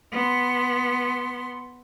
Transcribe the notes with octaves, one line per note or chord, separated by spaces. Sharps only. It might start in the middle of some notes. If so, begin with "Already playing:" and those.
B3 C6